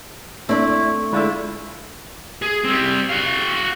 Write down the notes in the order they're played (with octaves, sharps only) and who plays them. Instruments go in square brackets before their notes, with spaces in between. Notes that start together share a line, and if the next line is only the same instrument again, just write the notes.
[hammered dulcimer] A3 [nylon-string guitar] C4 D4 [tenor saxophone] E4
[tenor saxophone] D3 [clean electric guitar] G#3 F4 E5 [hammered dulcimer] E4
[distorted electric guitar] G#4
G3 C4
F#4 F5